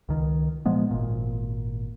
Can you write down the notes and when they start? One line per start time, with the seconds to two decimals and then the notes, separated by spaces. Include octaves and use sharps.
0.09 C#2 D#3
0.66 A#2 F3 G#3 B3
0.91 G#1 A#2